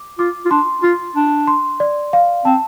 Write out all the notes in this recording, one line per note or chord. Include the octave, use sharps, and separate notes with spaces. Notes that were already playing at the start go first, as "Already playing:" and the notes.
Already playing: D6
F4 D6
F4
D4 C6
F4 C6
D4
C6
D5
F5
C4 A5